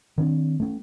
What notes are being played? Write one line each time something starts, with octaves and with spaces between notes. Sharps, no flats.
D#3 C4 D4
A3 C#4